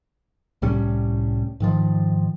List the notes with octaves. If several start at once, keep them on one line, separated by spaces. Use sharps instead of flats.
C2 A2 G3 C#4
G#2 D#3 F3